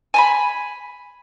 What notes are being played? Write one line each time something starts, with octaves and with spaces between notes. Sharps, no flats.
G#5 A5 B5